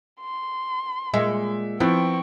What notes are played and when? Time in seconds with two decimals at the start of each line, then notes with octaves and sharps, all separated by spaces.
0.21 C6
1.14 A#2 G#3 E5
1.80 F3 B3 C4 E4 G5 C#6